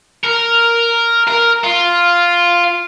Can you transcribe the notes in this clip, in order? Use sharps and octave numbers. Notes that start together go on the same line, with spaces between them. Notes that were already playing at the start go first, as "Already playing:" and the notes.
A#4
A#4
F4